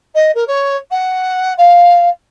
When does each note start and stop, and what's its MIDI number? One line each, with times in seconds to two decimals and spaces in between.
0.15 0.31 75
0.35 0.44 70
0.47 0.76 73
0.91 1.53 78
1.57 2.09 77